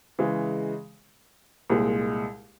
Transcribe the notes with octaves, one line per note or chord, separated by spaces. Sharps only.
C#3 E3 G#3
C2 A#2 G#3